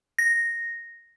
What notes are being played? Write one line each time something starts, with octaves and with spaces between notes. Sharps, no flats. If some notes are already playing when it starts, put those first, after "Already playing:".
A#6